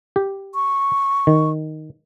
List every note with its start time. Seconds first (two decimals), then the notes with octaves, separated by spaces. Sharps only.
0.16 G4
0.55 C#6
1.27 D#3